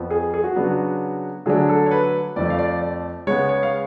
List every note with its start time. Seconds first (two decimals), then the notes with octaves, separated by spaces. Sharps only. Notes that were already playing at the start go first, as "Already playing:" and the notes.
Already playing: F2 F3 B3
0.10 G#4
0.34 G#4
0.44 F#4
0.56 C#3 F#3 B3 D4
0.64 F#4
1.46 D3 F#3 A3 D4 G#4
1.69 A4
1.86 C#5
1.91 B4
2.36 F2 F3 A3 D5
2.50 F5
2.59 D5
2.81 D5
3.27 C#3 G#3 B3 C#5
3.49 C#5
3.63 F5